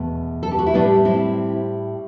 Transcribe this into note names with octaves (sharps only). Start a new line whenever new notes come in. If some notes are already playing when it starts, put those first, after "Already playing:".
Already playing: E2 B2 A3
A4
G4
F#4
E4
A2 G3 B3 D4
C4 E4